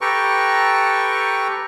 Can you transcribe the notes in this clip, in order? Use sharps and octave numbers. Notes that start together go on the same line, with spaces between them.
G4 A4 B4 G5 A#5 C#6